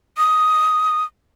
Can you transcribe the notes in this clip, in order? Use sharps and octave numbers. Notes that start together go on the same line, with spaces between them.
D#6